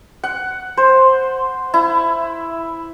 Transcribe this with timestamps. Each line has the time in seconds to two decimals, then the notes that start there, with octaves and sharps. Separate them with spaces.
0.24 F#5
0.77 C5
1.74 E4